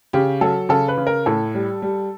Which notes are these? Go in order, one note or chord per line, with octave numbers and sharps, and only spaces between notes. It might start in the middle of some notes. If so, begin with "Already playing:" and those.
C#3 G4
F#3 A4
C#3 A4
B4
C#3
A#4
A2 A4
G3
G3